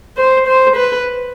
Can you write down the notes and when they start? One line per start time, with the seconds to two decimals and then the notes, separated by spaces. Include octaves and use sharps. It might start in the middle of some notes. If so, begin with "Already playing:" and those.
0.17 C5
0.47 C5
0.76 B4